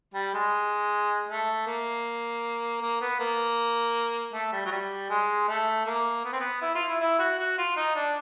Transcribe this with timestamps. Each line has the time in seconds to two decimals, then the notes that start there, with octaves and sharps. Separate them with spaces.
0.14 G3
0.34 G#3
1.29 A3
1.67 A#3
2.81 A#3
3.01 B3
3.20 A#3
4.33 A3
4.53 G3
4.65 F#3
4.71 G3
5.10 G#3
5.48 A3
5.85 A#3
6.24 B3
6.32 C4
6.40 B3
6.62 E4
6.75 F4
6.88 E4
7.01 E4
7.19 F#4
7.39 F#4
7.58 F4
7.76 D#4
7.96 D4